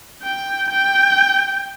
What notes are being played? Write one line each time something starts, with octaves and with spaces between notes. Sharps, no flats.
G5
G5